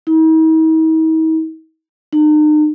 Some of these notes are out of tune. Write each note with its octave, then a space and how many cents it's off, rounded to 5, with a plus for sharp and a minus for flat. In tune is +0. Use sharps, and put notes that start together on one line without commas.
D#4 +45
D#4 -40